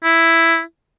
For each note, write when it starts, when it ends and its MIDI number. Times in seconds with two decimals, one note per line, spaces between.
0.04 0.61 64